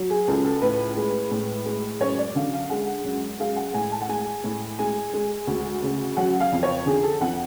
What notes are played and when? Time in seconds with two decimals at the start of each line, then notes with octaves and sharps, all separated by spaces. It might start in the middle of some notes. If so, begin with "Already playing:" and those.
Already playing: F#3
0.10 G#4
0.28 C#2 A4
0.44 A4
0.62 A2 B4
0.97 G#3
1.31 A2
1.65 G#3
2.00 F#2 C#5
2.18 D5
2.35 D3 F5
2.53 F5
2.70 G#3 F#5
3.04 F#2
3.40 G#3 F5
3.56 F#5
3.74 A2 G#5
3.92 A5
4.01 F#5
4.08 G#3 G#5
4.44 A2
4.79 G#3 G#5
5.13 G#3
5.47 D2
5.83 C#3
6.17 F#3 F#5
6.40 F5
6.52 F2
6.63 C#5
6.86 D3 G#4
7.03 A4
7.21 F2 F#5